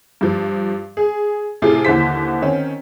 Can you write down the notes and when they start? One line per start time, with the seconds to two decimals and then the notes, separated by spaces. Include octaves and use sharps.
0.21 G2 F3
0.97 G#4
1.62 A2 C3 F4 G#4 A4
1.85 D#2 D3 E3 C5 B6
2.42 D#3 C4 C#4